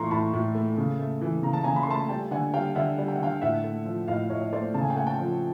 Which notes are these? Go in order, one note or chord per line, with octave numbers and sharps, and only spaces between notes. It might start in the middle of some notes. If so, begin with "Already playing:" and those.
Already playing: A2 E3 A3 A#5 C6 C#6
A2 A5 B5
A2
A3
C#3
A3
E3
C#3 A#5
A5
C#3 G#5 A#5
B5
C6
A3 A5 B5
G3 G5 A5
D3 F#5 G#5
G3 F5 G5
D3 E5 F#5
G3
G5
F#5
D3 F5 G5
A2 E5 F#5
A3
F3
A2 D#5 F5
A2 C#5 D#5
D#5
A3 C5 D5
C#3 A5
G#5
G5
A3 F#5 G#5
G5 A5
F3